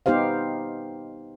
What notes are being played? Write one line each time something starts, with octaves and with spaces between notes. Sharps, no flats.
B3 D#4 G4 C5 F5